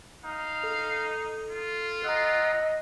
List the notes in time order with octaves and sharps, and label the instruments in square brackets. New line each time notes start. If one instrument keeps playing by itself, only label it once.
[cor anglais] D#4 [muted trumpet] F5
[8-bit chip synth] A4
[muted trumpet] F4
[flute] D#5 [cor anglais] F#5 [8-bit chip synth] A#5 D#6 E6